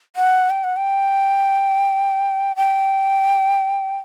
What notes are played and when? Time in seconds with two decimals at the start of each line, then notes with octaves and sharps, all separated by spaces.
0.16 F#5
0.50 G5
0.64 F#5
0.77 G5
2.56 G5